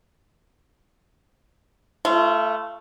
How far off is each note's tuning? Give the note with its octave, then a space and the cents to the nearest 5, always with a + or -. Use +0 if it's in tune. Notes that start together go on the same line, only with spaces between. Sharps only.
A3 +0 F4 -30